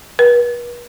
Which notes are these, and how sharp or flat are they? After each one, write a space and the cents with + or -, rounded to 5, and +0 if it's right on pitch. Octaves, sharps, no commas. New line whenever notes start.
B4 -40